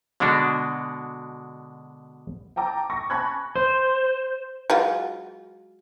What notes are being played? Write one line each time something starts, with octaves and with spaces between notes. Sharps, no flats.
B2 D3 G#3 D4 F#4
G5 A5 A#5 D6
C#6 A#6
G#5 A5 B5 C#6 F#6 G#6
C5
F#3 G#3 F4